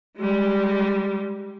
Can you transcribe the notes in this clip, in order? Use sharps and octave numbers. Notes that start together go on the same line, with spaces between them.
G3 G#3